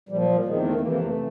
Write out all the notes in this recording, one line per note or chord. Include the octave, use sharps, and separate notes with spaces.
A#2 F3 G3
F#3
G3
E2 C3 D#3 G#3
A3
F2 C3 E3 A#3
A#3
A3
E3